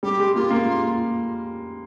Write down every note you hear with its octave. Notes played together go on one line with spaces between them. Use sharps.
G3 G4
G#3
A#3 F4
A#3